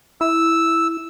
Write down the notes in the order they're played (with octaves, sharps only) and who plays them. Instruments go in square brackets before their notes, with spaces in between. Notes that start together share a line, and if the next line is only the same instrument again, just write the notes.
[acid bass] E4 [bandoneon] E6